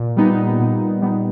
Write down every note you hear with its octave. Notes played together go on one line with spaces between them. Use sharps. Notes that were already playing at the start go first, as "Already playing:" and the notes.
Already playing: A#2
G3 B3 D#4
A#2
G3 B3 D#4